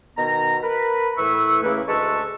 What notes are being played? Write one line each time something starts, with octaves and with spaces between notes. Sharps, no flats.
B2 D#3 B3 A#5
A#4 B4 B5
A2 E3 B4 E5 C#6 E6
C#3 E3 A3 A#3 B4
D2 G#3 B4 A5 C#6 E6